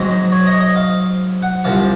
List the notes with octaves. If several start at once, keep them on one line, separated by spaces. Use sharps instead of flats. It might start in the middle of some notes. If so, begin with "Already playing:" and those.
Already playing: G#2 F#3 C4 D#5
C#5
D#5
D#5
F5
F#5
C2 C3 F3 F5